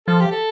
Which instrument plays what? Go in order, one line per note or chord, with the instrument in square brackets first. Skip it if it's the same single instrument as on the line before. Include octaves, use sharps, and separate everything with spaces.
[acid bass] F3 [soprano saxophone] A4
[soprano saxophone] G4
A4